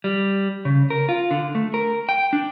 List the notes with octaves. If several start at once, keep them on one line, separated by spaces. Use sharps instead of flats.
G3
C#3
A#4
F4
D3
A3
A#4
G5
D4